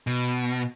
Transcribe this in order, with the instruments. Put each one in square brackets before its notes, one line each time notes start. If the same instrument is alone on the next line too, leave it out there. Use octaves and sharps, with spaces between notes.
[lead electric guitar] B2